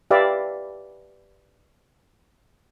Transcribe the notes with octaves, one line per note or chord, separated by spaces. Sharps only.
G4 B4 D5 E5 F5